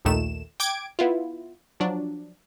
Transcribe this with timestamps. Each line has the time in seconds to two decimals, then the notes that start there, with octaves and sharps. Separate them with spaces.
0.05 A#1 D#2 A#2 D#3 A3 E7
0.60 G5 D6 G#6 D7
0.99 B3 E4 F4
1.80 F3 F#3 D4